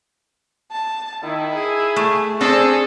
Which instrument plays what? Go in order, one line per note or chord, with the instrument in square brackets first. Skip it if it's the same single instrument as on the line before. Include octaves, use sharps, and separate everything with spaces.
[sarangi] A5
[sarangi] D#3 [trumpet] E4
[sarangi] G#4
[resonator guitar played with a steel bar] A3
[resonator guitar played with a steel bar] C4 D4 C5 [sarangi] G#4 [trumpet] A4